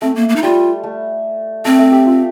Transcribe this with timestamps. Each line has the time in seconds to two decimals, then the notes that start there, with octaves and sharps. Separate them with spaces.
0.02 A3 C4
0.16 A#3
0.29 A#3
0.36 D#4
0.43 G3 F4
0.84 A3
1.65 A3 C4
1.79 A3
1.92 G4
2.06 F4